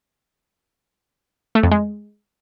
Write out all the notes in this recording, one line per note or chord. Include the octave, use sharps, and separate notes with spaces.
A3
F2
G#3